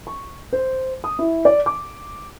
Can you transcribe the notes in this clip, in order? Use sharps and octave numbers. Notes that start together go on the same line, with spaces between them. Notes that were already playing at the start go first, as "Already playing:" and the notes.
C#6
C5
D#6
E4
D5
D6